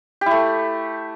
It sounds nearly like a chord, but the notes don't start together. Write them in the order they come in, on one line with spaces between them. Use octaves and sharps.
G4 E4 A3